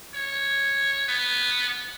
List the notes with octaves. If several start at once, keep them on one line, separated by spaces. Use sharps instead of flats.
C#5
B3